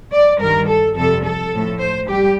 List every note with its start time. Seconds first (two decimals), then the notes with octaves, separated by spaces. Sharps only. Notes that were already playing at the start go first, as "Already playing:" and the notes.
0.13 D5
0.41 G2 D#3 G3 A#4
0.68 A4
0.97 F2 C3 G3 A4
1.25 A4
1.53 A2 F3
1.80 C5
2.09 G3 G4